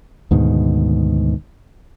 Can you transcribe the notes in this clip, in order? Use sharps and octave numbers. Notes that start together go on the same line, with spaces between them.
D2 G#2 B2 D#3